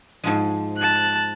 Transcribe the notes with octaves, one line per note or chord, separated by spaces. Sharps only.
G#2 F3 G#3
A5 F#6